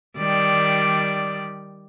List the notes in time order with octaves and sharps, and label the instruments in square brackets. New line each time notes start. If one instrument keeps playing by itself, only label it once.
[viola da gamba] D#3 G3 D5